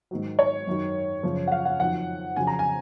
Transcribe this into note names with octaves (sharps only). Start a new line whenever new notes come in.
G#2 D#3 F#3
C#5
F#2 D#3 F#3
F#2 C#3 F3
F#5
F5
F#5
F2 D#3 F#3 F#5
F2 C#3 F#3 G#5
A#5
G#5